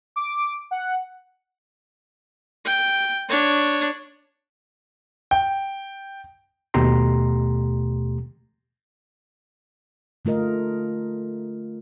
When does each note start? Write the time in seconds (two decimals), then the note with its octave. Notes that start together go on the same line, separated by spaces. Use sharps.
0.16 D6
0.71 F#5
2.65 G5
3.29 D4 C#5
5.31 G5
6.74 D#2 B2 A3 G4 A#5 C6
10.25 D3 A3 F4 A#4 D#5